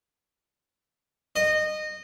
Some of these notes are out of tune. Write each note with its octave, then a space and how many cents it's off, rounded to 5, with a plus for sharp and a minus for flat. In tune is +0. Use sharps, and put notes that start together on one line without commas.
D#5 -20